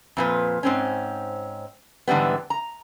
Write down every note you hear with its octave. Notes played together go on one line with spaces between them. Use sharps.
F2 A#2 B4
G#2 C4 C#4
G#2 D3 E3 G3 B3
A#5